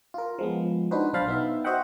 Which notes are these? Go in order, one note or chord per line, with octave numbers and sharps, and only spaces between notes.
F4 A#4
F3 G#3 B3
D4 D#4 F#4 B4 C5
B1 D4 C5 F5 B5 A6
B3 D#4 E5
F#4 C5 D#5 E5 F#5 G5